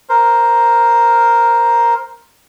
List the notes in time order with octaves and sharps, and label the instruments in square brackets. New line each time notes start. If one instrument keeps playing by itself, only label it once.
[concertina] A#4 C5